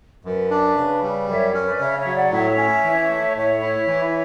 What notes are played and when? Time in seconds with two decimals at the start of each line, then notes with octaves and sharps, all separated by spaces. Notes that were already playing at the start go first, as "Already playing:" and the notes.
0.24 F#2 B4
0.51 D4
0.77 C#3
1.03 G3
1.28 F#2 C#5 E5
1.54 C#4
1.62 B4 D5
1.80 C#3 C#5 E5
1.97 C#5 E5
2.06 F#3
2.14 D5 F#5
2.32 A2 C#5 E5
2.57 C#4
2.84 E3
3.10 A3
3.35 A2 C#5 E5
3.61 E4
3.87 E3